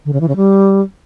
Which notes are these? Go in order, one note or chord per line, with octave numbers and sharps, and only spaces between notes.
D3
C#3
E3
C#3
G3